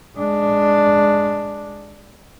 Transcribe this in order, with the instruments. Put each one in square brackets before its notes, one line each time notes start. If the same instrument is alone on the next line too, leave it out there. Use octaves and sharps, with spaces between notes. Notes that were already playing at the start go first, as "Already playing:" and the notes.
[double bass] G#3 D4